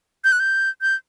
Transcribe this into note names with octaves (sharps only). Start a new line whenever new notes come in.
G6
F#6
G6
G6